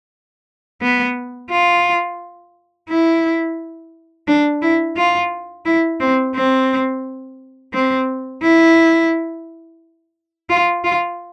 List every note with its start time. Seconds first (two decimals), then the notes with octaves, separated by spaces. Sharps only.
0.82 B3
1.51 F4
2.89 E4
4.28 D4
4.62 E4
4.97 F4
5.66 E4
6.00 C4
6.35 C4
7.73 C4
8.42 E4
10.49 F4
10.84 F4